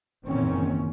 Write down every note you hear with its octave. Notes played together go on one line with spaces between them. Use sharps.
F#1 E2 A#2 D#3 C4 C#4